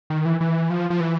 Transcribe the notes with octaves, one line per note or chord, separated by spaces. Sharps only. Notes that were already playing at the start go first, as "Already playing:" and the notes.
D#3
E3
E3
F3
F3
E3